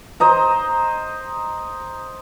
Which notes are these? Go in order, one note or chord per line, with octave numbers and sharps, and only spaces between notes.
C5 D#5 A#5